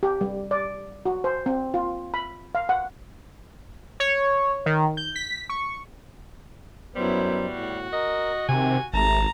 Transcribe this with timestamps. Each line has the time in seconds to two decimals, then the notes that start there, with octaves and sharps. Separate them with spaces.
0.03 G4
0.21 G3
0.51 D5
1.06 F#4
1.24 C5
1.46 C4
1.74 F4
2.14 B5
2.55 F5
2.69 F#5
4.00 C#5
4.66 D#3
4.97 G6
5.16 B6
5.50 C#6
6.96 F#2 F#3 G3 B3 E4 C5
7.50 A2 F#4
7.92 A#4 D#5
8.49 C3 D#3 G#5
8.94 G#1 C3 A3 A5 A#5